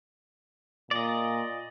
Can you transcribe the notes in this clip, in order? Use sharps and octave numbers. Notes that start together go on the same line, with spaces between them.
A#2 D5 D#5